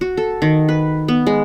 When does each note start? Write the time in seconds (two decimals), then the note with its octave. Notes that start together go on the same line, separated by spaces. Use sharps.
0.01 F#4
0.17 A4
0.42 D#3
0.69 B4
1.08 B3
1.27 G#3